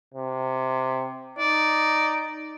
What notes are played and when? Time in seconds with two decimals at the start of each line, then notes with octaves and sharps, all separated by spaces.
0.14 C3
1.39 D#4 D5